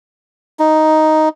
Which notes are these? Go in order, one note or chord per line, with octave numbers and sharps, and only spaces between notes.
D#4